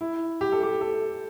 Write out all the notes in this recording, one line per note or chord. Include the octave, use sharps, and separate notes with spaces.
E4
G4
A4
G4
A4